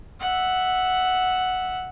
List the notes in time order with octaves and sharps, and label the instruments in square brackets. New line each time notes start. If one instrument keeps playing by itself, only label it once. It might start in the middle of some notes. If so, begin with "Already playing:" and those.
[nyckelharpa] E5 F#5